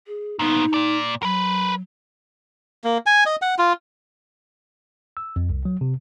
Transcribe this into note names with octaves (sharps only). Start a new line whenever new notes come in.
G#4
A#2 B3 D#4
A#2 D5
F#3 A#4 B4
A#3
G#5
D#5
F#5
F4
E6
F2
C2
F#3
C3